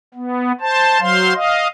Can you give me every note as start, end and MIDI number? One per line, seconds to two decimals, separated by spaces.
0.14 0.52 59
0.61 1.00 72
0.61 1.00 81
1.00 1.33 54
1.00 1.33 72
1.00 1.33 77
1.00 1.33 84
1.35 1.68 75
1.35 1.68 77